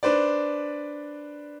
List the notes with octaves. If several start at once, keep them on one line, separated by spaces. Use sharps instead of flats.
D4 B4 C5 D5